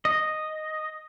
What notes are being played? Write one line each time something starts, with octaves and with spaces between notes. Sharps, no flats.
D#5